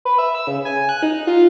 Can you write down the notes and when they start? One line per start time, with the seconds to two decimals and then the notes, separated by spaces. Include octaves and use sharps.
0.05 B4
0.18 E5
0.35 E6
0.47 C#3
0.65 G#5
0.89 F#6
1.03 D#4
1.27 F4